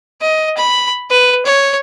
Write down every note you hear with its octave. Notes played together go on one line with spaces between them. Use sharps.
D#5
B5
B4
C#5